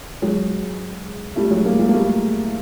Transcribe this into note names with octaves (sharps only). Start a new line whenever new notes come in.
F#3 G#3
G3 A3
F#3 G#3
G#3 A#3
G#3 A#3
A#3
G3 A3